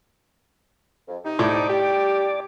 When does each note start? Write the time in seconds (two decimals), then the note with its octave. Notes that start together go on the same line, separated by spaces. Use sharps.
1.08 F2
1.25 C3 D#4
1.39 A2 D5
1.69 G4